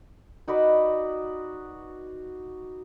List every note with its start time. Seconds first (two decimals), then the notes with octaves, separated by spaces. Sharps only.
0.48 D#4 F#4 B4 D5